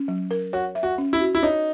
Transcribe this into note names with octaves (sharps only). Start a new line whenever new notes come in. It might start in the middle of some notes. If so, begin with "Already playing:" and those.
Already playing: C#4
F#3
A#4
F#4 C#5
E5
F#4
C#4
E4
F#4
E4
D#4 C#5